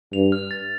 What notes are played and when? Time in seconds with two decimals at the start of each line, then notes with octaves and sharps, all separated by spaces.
0.13 G2 F7
0.32 F6
0.51 A6